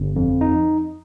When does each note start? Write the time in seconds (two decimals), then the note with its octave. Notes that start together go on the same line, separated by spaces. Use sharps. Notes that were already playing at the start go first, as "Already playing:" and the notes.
Already playing: G1
0.16 F2
0.41 D#4